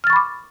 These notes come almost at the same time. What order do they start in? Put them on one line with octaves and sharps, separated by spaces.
F6 A6 C#6 B5 D6